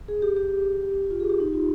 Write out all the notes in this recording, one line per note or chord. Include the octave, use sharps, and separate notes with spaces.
G#4
G4
G4
F4
G#4
G4
D#4
F4